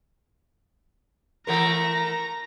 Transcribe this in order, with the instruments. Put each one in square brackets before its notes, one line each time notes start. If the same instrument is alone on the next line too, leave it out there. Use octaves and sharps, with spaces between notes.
[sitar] E3 A3 A#4 [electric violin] A#5